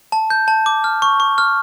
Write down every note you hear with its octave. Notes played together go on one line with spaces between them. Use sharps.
A5
G6
A5
D6
F6
C#6
C#6
F6